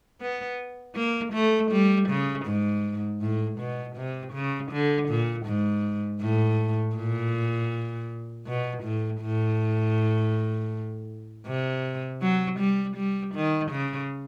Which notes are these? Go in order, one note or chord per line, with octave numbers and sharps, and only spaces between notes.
B3
A#3
A3
G3
C#3
G#2
A2
B2
C3
C#3
D3
A#2
G#2
A2
A#2
B2
A2
A2
C3
F#3
G3
G3
D#3
C#3